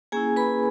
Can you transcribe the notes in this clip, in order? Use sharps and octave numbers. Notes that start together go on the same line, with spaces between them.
A#3 C#4 E4 G#4 G#5
B4 B5